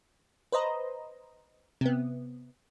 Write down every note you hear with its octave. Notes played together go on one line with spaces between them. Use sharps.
B4 C5 D#5 A#5
C3 B3